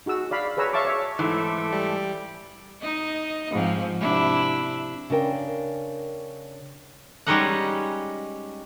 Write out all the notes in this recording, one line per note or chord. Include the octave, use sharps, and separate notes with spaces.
D#4 F#4 G#4 E6
D5 F5 B5
G#4 B4 C#5 A#5 E6
C#5 E5 F5 A5 C#6 D6
C#5 E5
G#2 E3 A3 A4 D6
G3
D#4 D#5
G#2 F3 C4
C3 D4 E4
C#3 D4 A#4 G5
G3 G#3 C#4 D#4 D#5 F#5